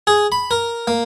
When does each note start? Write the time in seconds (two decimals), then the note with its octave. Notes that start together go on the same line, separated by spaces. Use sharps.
0.07 G#4
0.32 B5
0.51 A#4
0.87 A#3